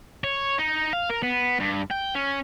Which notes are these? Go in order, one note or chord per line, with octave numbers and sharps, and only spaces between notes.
C#5
D#4
F5
A#4
B3
G2
G5
C#4